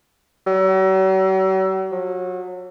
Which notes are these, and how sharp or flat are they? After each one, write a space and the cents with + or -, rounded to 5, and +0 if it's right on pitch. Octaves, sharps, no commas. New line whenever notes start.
F#3 +45
F#3 -30